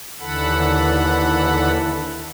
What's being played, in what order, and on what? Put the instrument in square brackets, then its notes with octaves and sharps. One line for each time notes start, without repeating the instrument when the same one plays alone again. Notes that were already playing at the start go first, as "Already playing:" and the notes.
[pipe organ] D#2 D3 E3 A4 F#5 B5